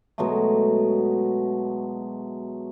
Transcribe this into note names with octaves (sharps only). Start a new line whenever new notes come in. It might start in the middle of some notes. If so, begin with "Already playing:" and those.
B2 F#3 G#3 A3